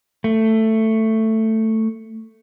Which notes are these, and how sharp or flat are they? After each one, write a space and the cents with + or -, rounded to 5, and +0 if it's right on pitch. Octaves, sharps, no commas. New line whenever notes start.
A3 +10